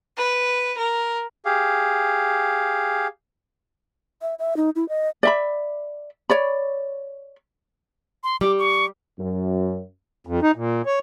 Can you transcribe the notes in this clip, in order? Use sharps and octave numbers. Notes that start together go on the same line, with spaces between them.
B4
A#4
G4 G#4 F5
E5
E5
D#4
E4
D#5
D5 E5 B5
C#5 D5 B5
C6
G3 D6
C#6
F#2
F2
D#4
A#2
C#5